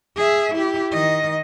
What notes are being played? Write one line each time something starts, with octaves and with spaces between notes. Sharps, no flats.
G#4 E5
E4 G4
D#3 D#5